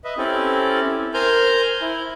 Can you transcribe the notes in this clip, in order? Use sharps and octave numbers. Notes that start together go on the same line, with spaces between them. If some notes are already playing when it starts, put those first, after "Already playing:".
B4 D#5 E5
C4 C#4 E4 G4 A4
A#4 C5 G#5 F6 G6
E4